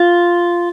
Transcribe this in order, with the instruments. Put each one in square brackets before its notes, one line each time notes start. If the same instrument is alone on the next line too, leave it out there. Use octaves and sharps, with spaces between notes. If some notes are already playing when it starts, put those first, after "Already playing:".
Already playing: [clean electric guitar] F4